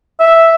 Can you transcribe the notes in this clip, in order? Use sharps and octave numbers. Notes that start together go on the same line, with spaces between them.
E5